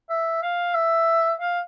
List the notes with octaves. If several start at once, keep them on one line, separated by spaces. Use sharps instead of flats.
E5
F5
E5
F5